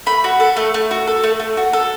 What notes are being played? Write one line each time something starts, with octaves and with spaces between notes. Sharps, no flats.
A3 B5
F#4
A4
A3
A3
F#4
A4
A3
A3
F#4
A4